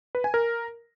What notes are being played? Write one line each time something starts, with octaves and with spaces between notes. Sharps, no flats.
B4
G#5
A#4